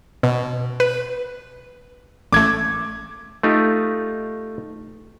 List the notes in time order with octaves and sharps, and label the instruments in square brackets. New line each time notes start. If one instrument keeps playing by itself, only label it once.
[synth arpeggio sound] B2
B4
[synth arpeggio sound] A1 A3 [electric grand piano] D6 G#6
[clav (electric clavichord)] A3 D#4 F4 G4